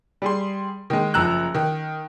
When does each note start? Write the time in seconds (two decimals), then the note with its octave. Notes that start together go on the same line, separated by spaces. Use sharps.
0.22 G3 G#4 C6
0.90 D#3 G#3
1.14 F#1 F3 A#5 E6 F#6
1.55 D#3